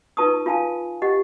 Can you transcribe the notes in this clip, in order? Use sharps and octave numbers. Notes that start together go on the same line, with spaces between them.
D#4 F4 B4 A5 C#6 D#6
F4 F5 G#5 A5
G4 D#5 F#5